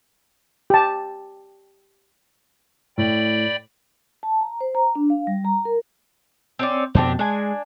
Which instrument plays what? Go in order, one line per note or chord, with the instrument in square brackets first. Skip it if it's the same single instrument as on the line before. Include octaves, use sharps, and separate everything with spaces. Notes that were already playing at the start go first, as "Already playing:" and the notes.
[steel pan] G4 A5
[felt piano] A2 [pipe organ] D5 G5 B5
[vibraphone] A5
A#5
C5
A#5
D4
F5
G3
A#5
A#4
[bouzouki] C4 C#4 D5
[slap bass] F2 B2 [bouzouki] C4 D4 G4
[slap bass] G#3 [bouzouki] D4 G#5